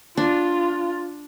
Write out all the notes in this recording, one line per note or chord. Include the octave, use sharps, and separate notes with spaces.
D4 F4